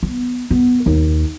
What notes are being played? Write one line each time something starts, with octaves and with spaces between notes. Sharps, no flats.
B3
B3
D#2